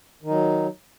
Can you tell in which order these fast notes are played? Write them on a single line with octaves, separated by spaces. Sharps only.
D#3 D#4 F#3